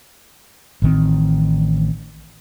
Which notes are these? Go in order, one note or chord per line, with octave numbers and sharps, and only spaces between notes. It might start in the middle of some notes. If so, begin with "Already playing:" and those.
A1 D#3 C4